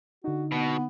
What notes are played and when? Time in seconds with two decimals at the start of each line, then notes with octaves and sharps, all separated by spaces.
0.24 D3 D#4 F#4
0.52 B2 B3